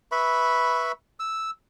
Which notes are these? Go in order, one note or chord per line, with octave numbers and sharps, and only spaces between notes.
B4 E5 B5 C#6
E6